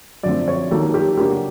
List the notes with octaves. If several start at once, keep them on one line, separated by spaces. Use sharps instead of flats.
F#2 D3 F3 A3 C4 D5
C#5
D#2 D#3 F#3 A#3 A4
G4
C#3 F#3 A#3 D4 G4
F#4